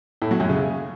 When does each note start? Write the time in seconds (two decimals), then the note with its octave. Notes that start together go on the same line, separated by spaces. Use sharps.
0.22 A2
0.31 F#3
0.40 F#2
0.49 C#3